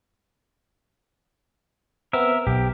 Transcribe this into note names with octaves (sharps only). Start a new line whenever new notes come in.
B3 C4 A#4 E5
B1 G4